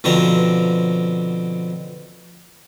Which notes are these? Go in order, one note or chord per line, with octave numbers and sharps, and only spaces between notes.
B2 D3 F3 C4 A#5